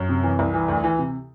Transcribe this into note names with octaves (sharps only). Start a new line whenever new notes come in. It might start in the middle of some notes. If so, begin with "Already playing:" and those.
Already playing: F#2
C3
E3
C2
E3
D2
E3
C3